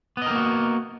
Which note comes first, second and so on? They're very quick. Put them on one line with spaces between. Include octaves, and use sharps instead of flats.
B3 D#5 A#4 A#3 F#4